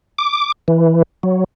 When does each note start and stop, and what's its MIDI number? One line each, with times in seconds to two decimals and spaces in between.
0.18 0.52 86
0.68 1.02 52
1.23 1.44 54